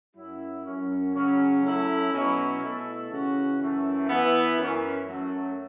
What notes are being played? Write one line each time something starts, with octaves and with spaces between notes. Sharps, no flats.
F#2 F#3 C#4 E4
F#2 F#3 C#4
C#3 F#3 C#4
F#3 A3 C#4 E4 A4
B2 F#3 C#4 E4
B2 A3 E4 A4
C#3 E3 C#4 F#4
F#2 E3 A3
E3 B3 E4
F#2 E3 C#4
F#2 F#3 A3